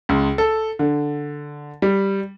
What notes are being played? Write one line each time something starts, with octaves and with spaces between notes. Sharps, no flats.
C#2
A4
D3
G3